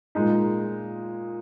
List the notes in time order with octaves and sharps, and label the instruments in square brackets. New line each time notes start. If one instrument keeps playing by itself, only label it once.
[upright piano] A#2 G#3 D#4